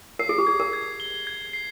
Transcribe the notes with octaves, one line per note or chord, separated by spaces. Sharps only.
A#4 C7
G#4
G4
G#4 G#6
A#4
G#6
G7
G#6
C7